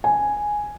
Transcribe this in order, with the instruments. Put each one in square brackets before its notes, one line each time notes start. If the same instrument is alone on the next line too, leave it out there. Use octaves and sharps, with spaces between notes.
[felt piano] G#5